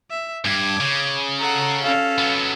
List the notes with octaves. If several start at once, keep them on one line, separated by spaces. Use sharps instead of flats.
E5
G2 D6 G#6
C#3
A4 F#5 A#5
C#4 A4 F5
F#3 B3